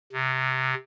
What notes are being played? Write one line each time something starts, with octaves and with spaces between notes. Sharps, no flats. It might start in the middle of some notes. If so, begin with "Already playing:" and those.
C3